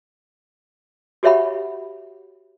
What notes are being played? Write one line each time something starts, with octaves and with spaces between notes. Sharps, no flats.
F#4 G4 C#5 E5 F#5 B5